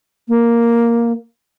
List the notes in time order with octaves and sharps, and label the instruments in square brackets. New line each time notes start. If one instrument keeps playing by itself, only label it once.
[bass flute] A#3